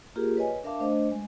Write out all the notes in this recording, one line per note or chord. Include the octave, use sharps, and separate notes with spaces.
A#3 F4 G4 G#4 A#4
B4 C#5 D#5 G#5
D4 A#4 E5 F5 A5 D6
A3 D4 C5 D#5
G#3